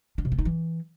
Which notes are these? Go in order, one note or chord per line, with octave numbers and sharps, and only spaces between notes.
D4
C3
B3
D#4
E3